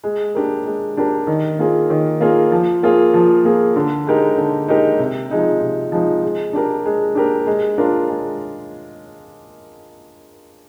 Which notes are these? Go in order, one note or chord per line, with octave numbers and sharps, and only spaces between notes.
G#3
D4 G4 A#4
G#3
D4 G4 A#4
D#3
A#3 F4 G#4
D#3
A#3 F4 G#4
F3
A#3 F4 G#4
F3
A#3 F4 G#4
D3
G#3 D#4 G4 A#4
D3
G#3 D#4 G4 A#4
C3
F3 G#3 D#4
C3
F3 G#3 D#4
G#3
D4 G4 A#4
G#3
D4 G4 A#4
G#3
D4 F4 A#4
G#3